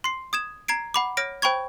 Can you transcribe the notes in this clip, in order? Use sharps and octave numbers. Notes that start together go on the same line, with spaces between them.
C6 C7
D#6 G#6 E7
A#5 G#6 C7 D7
F#5 B5 D6
C#5 F6 A#6 D7
C5 G5 B5 C#6 G#6